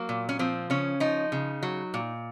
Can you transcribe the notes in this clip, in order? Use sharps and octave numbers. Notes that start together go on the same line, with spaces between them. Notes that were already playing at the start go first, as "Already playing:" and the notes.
Already playing: F#3 A#3
A#2
C#4
F3 C4
C#3 C#4
F3 D#4
C#3
F#3
A#2